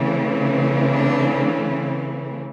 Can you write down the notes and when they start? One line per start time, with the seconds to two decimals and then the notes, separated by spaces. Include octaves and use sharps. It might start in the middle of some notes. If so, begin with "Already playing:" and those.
Already playing: C#3 E3 A3 C4
0.91 D4